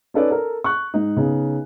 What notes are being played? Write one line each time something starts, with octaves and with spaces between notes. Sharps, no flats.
C#4 D#4 A4 B4 C#5 D5
A4 A#4
C#6 F#6
G#2 D#4
C#3 B3 D#4